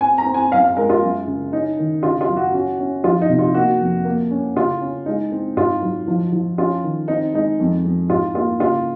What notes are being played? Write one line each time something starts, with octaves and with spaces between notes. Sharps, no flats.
C4 G#5
A#5
C4
G#5
F#2 F5
F5
G#3 A#4
F4
F#2
C#3
C#4 D#4
D#3
C#3 F4
F4
F#2
F#4
C#4 F#4
C#4
F3 F4
D#4
C3
F4
A#3 F#4
F2
A#3
C#4
C#3 F4
C#4
G#3 D#4
C4
G#2 F4
F#3
F3
F3
C#4 F4
D#3
C4 D#4
G#3 D#4
F2
F2
G#2 F4
A#3 F4
C#3 F4